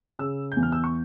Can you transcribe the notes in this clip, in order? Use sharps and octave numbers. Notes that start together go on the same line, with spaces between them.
C#3 E6
G6
E2
F6
E6
C#6